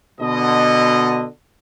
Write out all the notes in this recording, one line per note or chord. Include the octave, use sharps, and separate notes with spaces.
B2 D3 D#5